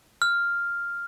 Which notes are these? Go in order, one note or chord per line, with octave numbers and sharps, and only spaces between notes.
F6